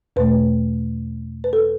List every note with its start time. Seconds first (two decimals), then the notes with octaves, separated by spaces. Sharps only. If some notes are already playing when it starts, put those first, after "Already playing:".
0.16 E2 B2 A3 B4
1.44 B4
1.53 A4